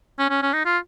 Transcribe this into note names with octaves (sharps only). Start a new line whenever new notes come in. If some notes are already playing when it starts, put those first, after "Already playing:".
C#4
C#4
C#4
D#4
F4